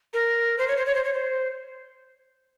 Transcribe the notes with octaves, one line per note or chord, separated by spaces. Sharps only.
A#4
C5
C#5
C5
C#5
C5
C#5
C5